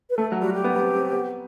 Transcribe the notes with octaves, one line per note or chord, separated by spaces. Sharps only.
B4
A3 A4
F#3
G3 F#4
G4
B3
B3
C4
C4
B3